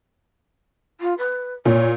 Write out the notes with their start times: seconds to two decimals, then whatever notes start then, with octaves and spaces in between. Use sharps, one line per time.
1.00 F4
1.18 B4
1.65 A#2 C#5